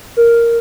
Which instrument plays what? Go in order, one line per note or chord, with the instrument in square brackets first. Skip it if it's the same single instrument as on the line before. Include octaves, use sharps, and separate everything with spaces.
[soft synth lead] A#4